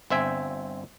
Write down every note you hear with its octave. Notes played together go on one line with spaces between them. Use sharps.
G1 C4 E5 G#5